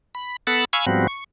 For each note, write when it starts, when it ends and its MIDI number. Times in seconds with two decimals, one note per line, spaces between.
0.15 0.36 83
0.47 0.65 59
0.47 0.65 69
0.47 0.65 78
0.47 0.65 81
0.47 0.65 83
0.73 0.86 77
0.73 0.86 80
0.73 0.86 83
0.73 0.86 85
0.73 0.86 88
0.86 1.07 44
0.86 1.07 53
0.86 1.07 55
0.86 1.07 59
0.86 1.07 60
0.86 1.07 66
1.08 1.24 85